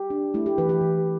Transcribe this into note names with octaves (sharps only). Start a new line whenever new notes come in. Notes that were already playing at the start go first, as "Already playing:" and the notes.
Already playing: G4
D4
A3 E4
G4
E3 B4
G4
E3